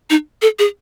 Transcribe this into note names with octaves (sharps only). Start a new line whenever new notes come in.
D#4
A4
G#4